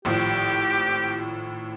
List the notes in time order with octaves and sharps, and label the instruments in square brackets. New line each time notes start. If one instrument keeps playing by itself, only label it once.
[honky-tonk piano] G#1 A2 F3 [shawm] G4